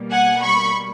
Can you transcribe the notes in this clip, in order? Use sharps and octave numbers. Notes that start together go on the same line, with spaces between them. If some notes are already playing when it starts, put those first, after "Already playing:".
Already playing: B2 G3 A#3
F#5 G#5
B5 C#6